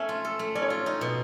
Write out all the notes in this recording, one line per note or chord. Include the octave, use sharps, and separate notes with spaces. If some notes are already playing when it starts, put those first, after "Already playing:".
Already playing: A3 C#4 E5
F4
A4
A3
C#4 D5
C#5
F4 D5
D#4
B2